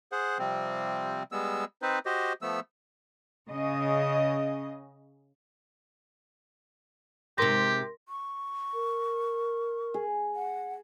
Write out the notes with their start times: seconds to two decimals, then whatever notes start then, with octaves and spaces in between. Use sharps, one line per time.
0.12 G#4 C5 F#5
0.39 C3 F3 G3 C4
1.32 G3 G#3 B3 E6
1.82 C4 D#4 B4 C5
2.06 F#4 G4 C5 D#5
2.42 F3 A3 B3 E6
3.47 C#3 D#5
7.38 G#2 C3 G4 A#4 C6 A#6
8.09 C#6
8.74 A#4
9.94 G#4
10.35 F#5